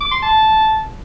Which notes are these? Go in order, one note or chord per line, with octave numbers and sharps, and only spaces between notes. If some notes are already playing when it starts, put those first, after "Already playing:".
D6
C6
A5